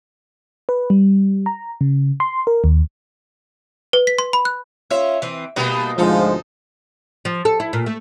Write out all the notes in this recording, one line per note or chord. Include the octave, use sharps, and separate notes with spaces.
B4
G3
A#5
C#3
C6
A#4
D#2
B4
B6
C6
B5
F#6
C#4 F4 E5
E3 C4
B2 G3 A#3 B3 D#4
D2 G#2 F3 G#3 D#4 A4
F3
A4
E4
A#2
A3